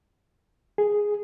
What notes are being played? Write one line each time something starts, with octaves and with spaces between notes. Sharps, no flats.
G#4